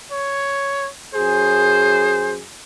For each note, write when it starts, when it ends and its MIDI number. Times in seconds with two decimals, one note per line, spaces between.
0.11 0.88 73
1.15 2.41 42
1.15 2.41 68
1.15 2.33 72